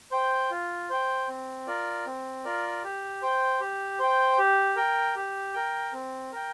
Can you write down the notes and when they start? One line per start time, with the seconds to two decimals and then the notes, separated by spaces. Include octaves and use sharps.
0.11 C5 G5
0.50 F4
0.90 C5 G5
1.28 C4
1.67 F4 A#4 D5
2.06 C4
2.44 F4 A#4 D5
2.84 G4
3.22 C5 G5
3.60 G4
3.99 C5 G5
4.38 G4
4.76 A#4 G5
5.15 G4
5.54 A#4 G5
5.93 C4
6.32 A#4 G5